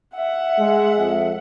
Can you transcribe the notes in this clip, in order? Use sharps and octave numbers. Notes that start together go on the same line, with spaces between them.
E5 F#5
G#3
F2